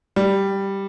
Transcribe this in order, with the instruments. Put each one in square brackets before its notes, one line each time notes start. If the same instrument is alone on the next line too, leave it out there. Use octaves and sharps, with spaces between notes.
[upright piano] G3